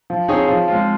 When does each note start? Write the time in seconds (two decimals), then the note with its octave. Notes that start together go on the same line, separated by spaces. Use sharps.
0.10 F3
0.28 C4 D#4 G#4 C#5
0.48 F3
0.68 G#3 C4 F4